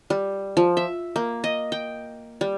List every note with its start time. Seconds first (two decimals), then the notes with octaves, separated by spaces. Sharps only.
0.10 G3
0.57 F3
0.77 E5
1.16 A#3
1.44 D#5
1.72 G5
2.41 G3